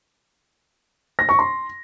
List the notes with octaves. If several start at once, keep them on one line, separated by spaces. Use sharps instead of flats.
A#6
C#6
C6